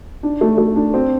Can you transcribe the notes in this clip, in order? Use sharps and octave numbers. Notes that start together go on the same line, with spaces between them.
D4
A3
A3
D4
C4